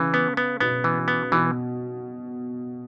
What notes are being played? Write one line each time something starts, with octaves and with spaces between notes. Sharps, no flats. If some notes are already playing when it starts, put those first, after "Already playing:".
Already playing: C#3 E3
B3
B3
B2 B3
E3
B3
B2 E3